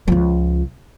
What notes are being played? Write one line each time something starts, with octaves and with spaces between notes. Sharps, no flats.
C#2 F3